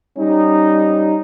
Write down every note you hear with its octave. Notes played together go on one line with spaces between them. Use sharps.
G3 C#4 D#4